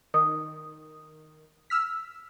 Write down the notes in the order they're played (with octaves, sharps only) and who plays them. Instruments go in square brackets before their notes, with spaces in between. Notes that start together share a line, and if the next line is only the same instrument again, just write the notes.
[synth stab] D#3 [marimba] D#6
[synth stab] E6 F6 B6